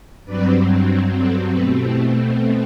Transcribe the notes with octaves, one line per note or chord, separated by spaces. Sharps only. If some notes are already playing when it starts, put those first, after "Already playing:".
G2 F#3 C4 B4 D5
F#4 A4
B2 A3 C4 G4 B4
E4 G4